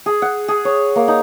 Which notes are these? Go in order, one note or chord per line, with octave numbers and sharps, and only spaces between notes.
G#4
F#5
G#4
C#5
A#3
D#4